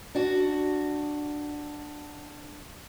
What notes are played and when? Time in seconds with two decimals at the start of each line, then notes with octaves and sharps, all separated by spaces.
0.15 D4 F#4